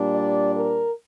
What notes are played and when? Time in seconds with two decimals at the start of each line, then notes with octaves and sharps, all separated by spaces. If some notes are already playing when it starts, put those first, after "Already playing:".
Already playing: A#2 G3 D4
0.13 D5
0.54 A#4